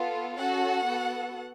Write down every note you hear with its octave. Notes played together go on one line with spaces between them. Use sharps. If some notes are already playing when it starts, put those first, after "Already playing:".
Already playing: B3 F4 A4
C#4 F#4 A4 F#5
B3 F#4 A4